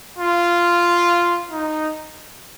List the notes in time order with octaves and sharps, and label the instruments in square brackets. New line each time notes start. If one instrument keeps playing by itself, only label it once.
[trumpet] F4
D#4